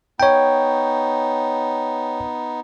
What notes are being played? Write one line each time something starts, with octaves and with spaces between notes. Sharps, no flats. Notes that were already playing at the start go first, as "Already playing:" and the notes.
B3 D#4 C#5 G5